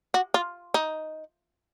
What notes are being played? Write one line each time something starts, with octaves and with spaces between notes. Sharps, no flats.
F#4
F4
D#4